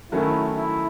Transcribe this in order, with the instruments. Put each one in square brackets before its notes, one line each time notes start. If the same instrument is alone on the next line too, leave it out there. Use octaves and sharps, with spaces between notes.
[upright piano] D#3 F#3 A3 C#4 [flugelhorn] E4
[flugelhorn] E4